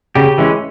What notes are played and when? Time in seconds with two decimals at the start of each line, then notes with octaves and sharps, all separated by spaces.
0.15 C#3 G4
0.38 E3 G#3 C#4